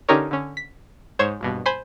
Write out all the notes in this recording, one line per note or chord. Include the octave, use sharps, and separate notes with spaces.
D3 C#4 D#4 G4 A#4 C#5
D3 C#4
B6
G#2 C5 C#5 G#6 E7
A#1 G2 B2
C5 G#5 B5 C6